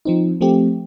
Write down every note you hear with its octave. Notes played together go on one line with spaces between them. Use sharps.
F3 C4 D#4
F3 A3 C4 G4